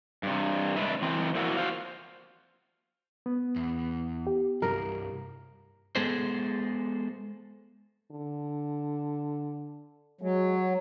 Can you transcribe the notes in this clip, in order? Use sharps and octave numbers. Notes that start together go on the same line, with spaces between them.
G2 C3
G#3 C4 D4 B4 E5
E3 C4
F3 A#3 D4 E4 F#4
F#4 C5 F5
B3
E2
G4
C2 G2 A#4
G#3 B3 G#4 A4 C5
D3
F#3 G#3